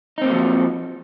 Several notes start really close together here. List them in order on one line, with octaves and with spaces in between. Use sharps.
D#4 C4 A#3 F#3 F3